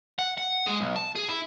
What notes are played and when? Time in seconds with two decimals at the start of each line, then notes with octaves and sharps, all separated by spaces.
0.19 F#5
0.38 F#5
0.66 G#3
0.81 B1
0.96 A5
1.15 G#4
1.29 E4